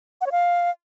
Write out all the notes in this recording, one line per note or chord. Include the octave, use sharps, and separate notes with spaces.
F#5
C#5
F5